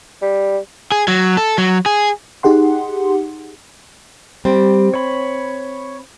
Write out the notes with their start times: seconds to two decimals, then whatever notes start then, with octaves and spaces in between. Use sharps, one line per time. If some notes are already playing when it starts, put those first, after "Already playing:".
0.22 G3
0.92 G#4
1.08 F#3
1.37 A4
1.58 F#3
1.86 G#4
2.43 D#4 G4 G#4 F#5 C6
4.45 G3 C4
4.94 C#5 B5